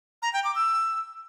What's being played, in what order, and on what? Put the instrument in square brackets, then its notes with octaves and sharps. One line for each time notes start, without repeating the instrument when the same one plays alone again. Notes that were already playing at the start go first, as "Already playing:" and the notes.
[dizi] A#5
G5
D6
E6